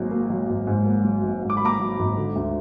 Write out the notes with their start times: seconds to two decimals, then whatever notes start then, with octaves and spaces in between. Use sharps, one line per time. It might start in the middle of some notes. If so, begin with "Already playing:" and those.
Already playing: G#1 G#2 F#3 A#3
0.11 A#3
0.30 F#3
0.49 G#1
0.67 G#2
0.86 A#3
1.04 F#3
1.23 G#1
1.42 G#2
1.50 D6
1.57 B5
1.61 A#3 A#5 D6
1.79 F#3
1.99 G#1
2.17 D3
2.36 D2